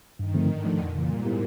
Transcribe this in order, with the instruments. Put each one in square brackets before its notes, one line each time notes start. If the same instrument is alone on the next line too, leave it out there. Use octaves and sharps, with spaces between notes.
[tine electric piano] G2 [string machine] D#3
[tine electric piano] D3 F3 A3 C4
[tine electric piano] G#2 [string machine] D3
[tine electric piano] F3 A3
[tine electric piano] F2 [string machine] A#2
[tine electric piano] C#3 E3
[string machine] G#2 [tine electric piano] G3
[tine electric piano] B3 E4 G4 A#4